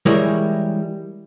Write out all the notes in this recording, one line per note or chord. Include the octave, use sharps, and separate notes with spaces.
E3 G3 G#3 E4 A#4 C#5